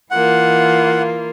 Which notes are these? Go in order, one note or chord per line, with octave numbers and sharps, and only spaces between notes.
E3 A#3 F4 F#5